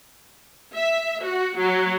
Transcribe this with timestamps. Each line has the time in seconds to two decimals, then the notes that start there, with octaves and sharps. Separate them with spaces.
0.72 E5
1.23 F#4
1.57 F#3